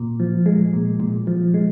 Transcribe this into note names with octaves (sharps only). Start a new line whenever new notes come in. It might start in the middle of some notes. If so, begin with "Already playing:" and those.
Already playing: A#2
F3
G#3
A#2
A#2
F3
G#3